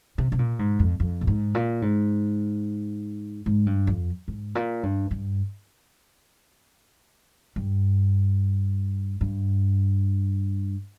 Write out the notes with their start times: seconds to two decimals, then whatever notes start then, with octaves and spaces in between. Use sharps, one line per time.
0.18 C3
0.32 C3
0.39 A#2
0.59 G#2
0.79 F2
1.00 F2
1.21 A#2
1.27 G#2
1.55 A#2
1.82 G#2
3.46 G#2
3.66 G2
3.87 F2
4.28 G#2
4.55 A#2
4.83 G2
5.11 G2
7.56 G2
9.21 G2